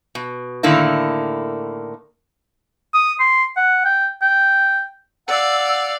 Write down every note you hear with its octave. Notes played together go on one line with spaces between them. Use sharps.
B2
A2 D3 D#3 A#3 E4
D#6
C6
F#5
G5
G5
D5 F5 F#5 E6